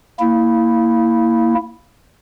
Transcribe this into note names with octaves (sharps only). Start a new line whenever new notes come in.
A#3 E4